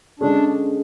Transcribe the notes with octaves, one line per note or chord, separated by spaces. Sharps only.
D3 G#3 C#4 D4 G#4